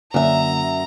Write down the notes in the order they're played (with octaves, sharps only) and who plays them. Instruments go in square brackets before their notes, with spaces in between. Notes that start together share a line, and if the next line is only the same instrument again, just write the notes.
[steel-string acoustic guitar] F#2 E5 [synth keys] D3 A#3 [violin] A#5